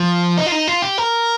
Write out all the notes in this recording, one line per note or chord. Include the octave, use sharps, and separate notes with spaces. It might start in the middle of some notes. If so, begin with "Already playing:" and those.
Already playing: F3
D#4
F4
D#4
F4
G4
A#4